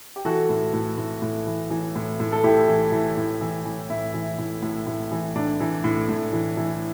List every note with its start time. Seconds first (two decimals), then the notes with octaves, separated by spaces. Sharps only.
0.16 G4
0.25 E3 F#4 A4
0.49 A2
0.74 A2
0.98 A2
1.22 A2
1.47 E3
1.70 E3
1.96 A2
2.20 A2
2.32 A4
2.44 A2 E4 G4
2.68 E3
2.92 E3
3.17 A2
3.41 E3
3.65 E3
3.90 A2 E4
4.14 E3
4.39 A2
4.62 A2
4.87 A2
5.12 E3
5.35 A2 D4
5.60 E3
5.84 A2
6.09 A2
6.33 E3
6.57 E3